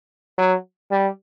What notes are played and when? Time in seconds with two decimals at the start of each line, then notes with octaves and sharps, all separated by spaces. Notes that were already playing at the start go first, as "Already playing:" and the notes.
0.38 F#3
0.91 G3